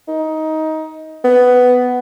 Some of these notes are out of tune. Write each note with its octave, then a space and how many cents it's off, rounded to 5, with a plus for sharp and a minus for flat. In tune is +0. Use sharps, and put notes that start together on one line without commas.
D#4 +15
B3 +10